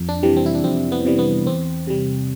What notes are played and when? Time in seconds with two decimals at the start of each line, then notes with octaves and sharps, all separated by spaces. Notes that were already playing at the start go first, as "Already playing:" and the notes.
Already playing: F2
0.09 D4
0.23 C3 E3 G3
0.37 C4
0.46 E4
0.55 D4
0.64 F2 C4
0.92 B3
1.05 C3 E3 G3
1.19 B3
1.47 E2 C4
1.87 C3 G3